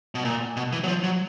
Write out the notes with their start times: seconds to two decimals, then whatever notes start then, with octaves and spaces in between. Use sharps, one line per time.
0.15 B2
0.25 A#2
0.56 B2
0.72 E3
0.84 F#3
0.88 F3
1.04 F#3